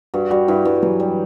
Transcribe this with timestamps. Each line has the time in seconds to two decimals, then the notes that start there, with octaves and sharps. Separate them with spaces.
0.14 G2 F#4
0.31 G3 F#4
0.48 G2 E4
0.65 G2 E4
0.82 E3 F#3
1.00 G3